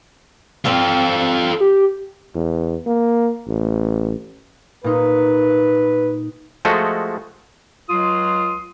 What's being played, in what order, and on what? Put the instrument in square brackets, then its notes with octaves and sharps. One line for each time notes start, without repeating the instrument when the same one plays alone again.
[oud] G2 F3 C4 [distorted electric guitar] F4 A4
[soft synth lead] G4
[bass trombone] E2
A#3
A1
[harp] A#2 D#4 [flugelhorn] B4
[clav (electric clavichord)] F3 G#3 A3 F#4 A4 D#5
[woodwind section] C#2 F#3 F4 C6 D#6